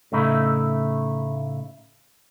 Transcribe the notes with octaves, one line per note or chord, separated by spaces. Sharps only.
A2 C#3 A3 D#4 E4